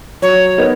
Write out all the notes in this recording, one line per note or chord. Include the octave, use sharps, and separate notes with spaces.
F#3 C#5
B3 D#4 A#4